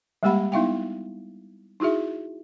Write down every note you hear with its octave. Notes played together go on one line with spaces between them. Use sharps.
G3 G#3 A#3 G4 F#5 B5
B3 D#4 E4 E5 F5 G5
D#4 E4 F#4 G#4 E5